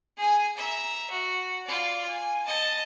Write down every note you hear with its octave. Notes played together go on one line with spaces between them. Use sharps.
G#4 G#5
E5 A#5
F#4
F4 D5
G#5
D#5 A5